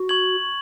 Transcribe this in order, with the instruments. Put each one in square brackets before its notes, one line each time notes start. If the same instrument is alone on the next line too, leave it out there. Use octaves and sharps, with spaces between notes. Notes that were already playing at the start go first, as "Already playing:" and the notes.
Already playing: [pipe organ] F#4
[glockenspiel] C#6 G#6 F#7